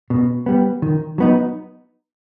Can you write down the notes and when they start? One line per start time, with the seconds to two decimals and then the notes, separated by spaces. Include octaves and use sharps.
0.10 B2
0.46 G3 B3
0.82 D#3
1.18 F#3 B3 D#4